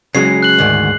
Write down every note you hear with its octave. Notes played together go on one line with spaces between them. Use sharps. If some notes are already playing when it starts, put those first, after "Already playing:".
C#3 F#3 G#3 C7
F#6 F#7
D2 G#2 D#3